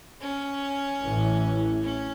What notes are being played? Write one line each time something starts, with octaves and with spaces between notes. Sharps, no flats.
C#4
A1 A2 E3
C#4